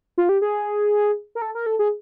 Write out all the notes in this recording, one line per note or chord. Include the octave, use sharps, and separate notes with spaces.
F4
G4
G#4
A#4
A4
A#4
A4
G#4